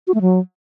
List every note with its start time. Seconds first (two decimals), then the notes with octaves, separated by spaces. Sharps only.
0.07 F#4
0.14 A3
0.21 F#3